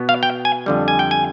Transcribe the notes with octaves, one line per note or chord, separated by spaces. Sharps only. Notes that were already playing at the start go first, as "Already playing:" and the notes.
Already playing: B2 B3
F5
G5
G#5
F2 D3 G3
G#5
G5
G#5